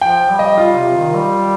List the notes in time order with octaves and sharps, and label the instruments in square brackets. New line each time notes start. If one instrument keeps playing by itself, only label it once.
[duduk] F3 [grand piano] G5
[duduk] G3
[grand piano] D#5
[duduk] G3 [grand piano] F4
[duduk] C3
D#3
G3